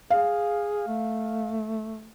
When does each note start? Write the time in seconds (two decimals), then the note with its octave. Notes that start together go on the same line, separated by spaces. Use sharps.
0.10 G#4 F5
0.87 A3